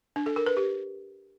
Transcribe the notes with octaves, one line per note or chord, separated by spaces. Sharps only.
D4
A4
A#4
B4
G4